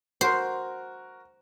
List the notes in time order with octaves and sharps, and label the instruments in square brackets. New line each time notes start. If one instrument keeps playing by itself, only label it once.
[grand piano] F#4 A#4 [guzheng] C5